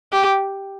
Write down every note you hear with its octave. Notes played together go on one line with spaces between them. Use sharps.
G4